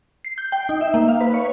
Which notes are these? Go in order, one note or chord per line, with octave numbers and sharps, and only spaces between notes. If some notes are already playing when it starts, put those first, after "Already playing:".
C7
G6
G5
D#4
E5
A#3
F5
B4
C#5